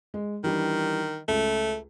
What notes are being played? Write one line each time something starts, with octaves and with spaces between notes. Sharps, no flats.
G#3
D#3 E3 G3 D4
C#2 A3